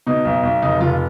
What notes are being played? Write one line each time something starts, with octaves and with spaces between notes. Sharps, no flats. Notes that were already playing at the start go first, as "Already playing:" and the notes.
B2 D#4
B1
B1
F1 D#4
F1 F4